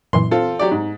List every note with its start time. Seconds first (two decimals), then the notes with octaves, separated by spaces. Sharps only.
0.13 F#2 A#2 E3 C6
0.31 C4 F4 A4
0.59 F#3 G4 D5
0.71 G#2